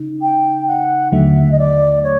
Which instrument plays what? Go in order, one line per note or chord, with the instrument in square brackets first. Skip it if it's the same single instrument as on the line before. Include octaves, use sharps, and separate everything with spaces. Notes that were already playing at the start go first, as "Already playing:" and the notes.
Already playing: [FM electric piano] C#3 D#4
[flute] G5
F#5
[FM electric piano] D#2 D3 F#3 A3 [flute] E5
[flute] D#5
D5
C#5